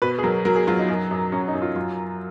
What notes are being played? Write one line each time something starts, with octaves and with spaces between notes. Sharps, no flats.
B2 B4
G#4
F#3 A#4
F#3 A#4
G#4
F#3 F4
D#4
F#2
F#2
F#2 C#4
D#4
F#2
F4
F#3 F4